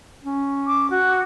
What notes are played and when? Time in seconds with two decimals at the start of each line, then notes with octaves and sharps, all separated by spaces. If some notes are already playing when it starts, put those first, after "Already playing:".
0.23 C#4
0.67 D6
0.91 F#4